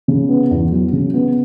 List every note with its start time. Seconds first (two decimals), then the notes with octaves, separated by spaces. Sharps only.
0.08 C#3
0.29 B3
0.51 E2
0.72 F#3
0.93 C#3
1.14 B3